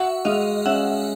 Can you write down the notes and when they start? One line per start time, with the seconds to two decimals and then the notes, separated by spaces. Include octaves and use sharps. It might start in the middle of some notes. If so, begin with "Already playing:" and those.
Already playing: F#4 E5 F#5
0.25 G#3 D#5 F5
0.66 C#4 E5 F#5